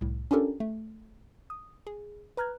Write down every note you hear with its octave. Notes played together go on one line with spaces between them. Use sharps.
C2 A2
C#4 D4 F4 G4 A4 A#4
A3
D#6
G#4
B4 A#5 F6 F#6 G#6